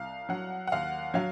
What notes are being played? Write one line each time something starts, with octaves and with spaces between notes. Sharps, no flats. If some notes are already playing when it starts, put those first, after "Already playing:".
Already playing: C2 F5
F#3 F#5
F#5
D#2 F5
F#3 F5